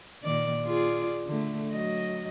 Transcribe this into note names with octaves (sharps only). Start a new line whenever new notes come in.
A#2 D#3 D5
F4 G#4 D5
D3 A3
F#3 D#5